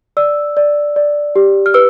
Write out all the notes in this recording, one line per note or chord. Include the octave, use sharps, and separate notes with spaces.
D5 E6
D5
D5
G4
F6
B4 E6